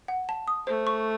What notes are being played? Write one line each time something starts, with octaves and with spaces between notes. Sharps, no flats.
F#5
A5
D#6
A3 C5
C#6